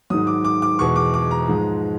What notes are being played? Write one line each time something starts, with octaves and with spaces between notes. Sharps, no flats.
G#2 D#3 F#3 D#6
D6
D6
D6
E2 B2 G#3 C#6
D6
D6
A#5
G#2 F3 G#3